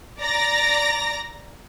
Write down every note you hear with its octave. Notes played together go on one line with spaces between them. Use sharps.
D5 A#5 A#6